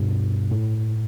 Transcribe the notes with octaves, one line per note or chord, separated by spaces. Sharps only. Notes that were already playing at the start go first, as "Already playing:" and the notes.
Already playing: G2 B2
A2